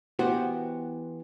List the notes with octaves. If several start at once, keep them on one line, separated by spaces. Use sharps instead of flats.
E3 B3 F#4 G4 C5